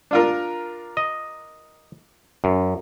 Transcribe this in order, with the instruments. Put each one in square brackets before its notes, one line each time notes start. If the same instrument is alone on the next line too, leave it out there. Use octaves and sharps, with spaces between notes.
[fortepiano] D4 F4 A#4
[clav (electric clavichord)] D#5
F#2